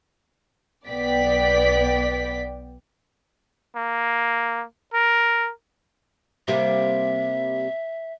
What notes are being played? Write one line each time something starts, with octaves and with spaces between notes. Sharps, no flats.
B1 B3 D5 G5 B6
A#3
A#4
C3 G3 A#3 E5